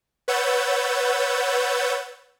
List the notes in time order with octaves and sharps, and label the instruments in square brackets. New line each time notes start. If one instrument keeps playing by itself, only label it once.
[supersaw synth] B4 C#5 F#5 E6 G6 A6